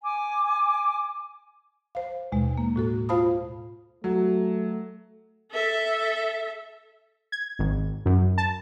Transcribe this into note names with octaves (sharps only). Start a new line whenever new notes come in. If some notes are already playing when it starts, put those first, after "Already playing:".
G#5 D6
C5 F5
D#2 B2 G#3
A#3
A2 F#4 A4
F4 C5 F5 A5 B5 D#6
F#3 A3
A4 E5
G#6
G#1
F#2
A5